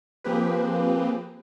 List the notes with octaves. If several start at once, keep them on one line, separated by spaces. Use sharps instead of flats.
F3 A#3 C4 G4 G#4 B4